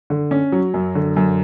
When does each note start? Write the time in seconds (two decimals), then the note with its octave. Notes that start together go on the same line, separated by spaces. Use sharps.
0.10 D3
0.31 C#4
0.52 F#3
0.74 F#2
0.95 D3
1.17 F#2